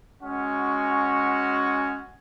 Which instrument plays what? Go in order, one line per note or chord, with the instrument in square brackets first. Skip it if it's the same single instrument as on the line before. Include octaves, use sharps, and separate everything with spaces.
[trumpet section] G#3 C#4 F#4 F#5 G#5 C#6